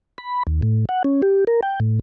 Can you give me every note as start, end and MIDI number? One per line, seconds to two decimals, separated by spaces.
0.18 0.43 83
0.47 0.61 39
0.62 0.85 45
0.89 1.03 78
1.04 1.22 61
1.22 1.44 67
1.47 1.61 70
1.63 1.80 79
1.80 1.99 45